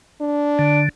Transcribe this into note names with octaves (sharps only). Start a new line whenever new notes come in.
D4
D3